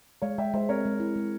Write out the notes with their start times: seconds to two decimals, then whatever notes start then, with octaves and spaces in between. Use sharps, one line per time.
0.22 G#3 C#5 F5
0.38 G#3 E5 G5
0.53 G#3 C5 E5
0.69 C4 A#4 C#5
0.85 G#3
1.00 E4
1.16 G#3